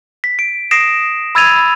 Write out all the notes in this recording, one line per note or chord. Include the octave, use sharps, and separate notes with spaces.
B6
D7
D#6 A#6 C7 D7 E7
B5 E6 G#6 A6 D#7 F7